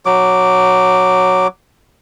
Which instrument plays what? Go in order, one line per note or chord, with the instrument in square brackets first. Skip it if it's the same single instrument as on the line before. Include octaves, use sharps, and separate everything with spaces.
[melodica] F#3 D6